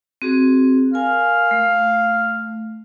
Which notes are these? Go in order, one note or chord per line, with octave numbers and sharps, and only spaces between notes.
C4 F#4 G#4
A#4 F5 G#5
A3